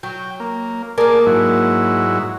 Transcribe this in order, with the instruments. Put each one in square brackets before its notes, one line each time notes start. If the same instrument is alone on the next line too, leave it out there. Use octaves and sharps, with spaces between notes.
[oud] F#3 [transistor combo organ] G5
[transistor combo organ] A#3
[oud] A#3 A#4 [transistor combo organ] G#4 D5 A5
[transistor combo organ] G#2 F#3 E4